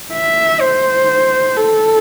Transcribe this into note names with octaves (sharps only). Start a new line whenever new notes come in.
E5
C5
A4